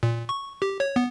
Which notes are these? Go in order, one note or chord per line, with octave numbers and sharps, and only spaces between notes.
A#2
C#6
G4
C#5
B3